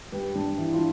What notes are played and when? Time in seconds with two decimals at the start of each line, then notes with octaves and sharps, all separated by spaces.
0.12 G2 G4 B4
0.35 G2 D4
0.58 E3 E4
0.74 D4 F4